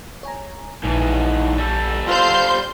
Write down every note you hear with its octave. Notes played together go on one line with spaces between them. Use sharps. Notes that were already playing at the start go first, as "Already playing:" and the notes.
C#5 G#5 A#5
A#1 G#2 E3 A5
G3 A4
F4 C5 C6 G6